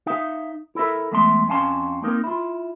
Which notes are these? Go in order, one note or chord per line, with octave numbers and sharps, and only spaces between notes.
D#4 E5 F5
E4 A4 A#4 E5
E2 G#3 A3 E5 A5 C6
F2 C#4 F5 G#5 A5 C6
A#3 C4 D#4 A#4
E4 F4